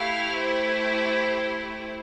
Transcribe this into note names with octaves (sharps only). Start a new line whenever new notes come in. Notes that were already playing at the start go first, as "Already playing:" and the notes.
Already playing: A3 E4 G4 F5
C5